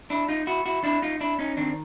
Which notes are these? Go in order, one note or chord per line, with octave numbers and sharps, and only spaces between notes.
D4 E4
D#4 F4
E4 F#4
E4 F#4
D4 E4
D#4 F4
D4 E4
C#4 D#4
D#3 C4 D4